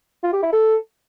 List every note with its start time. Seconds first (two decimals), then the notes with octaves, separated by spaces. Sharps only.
0.23 F4
0.33 G4
0.43 E4
0.52 A4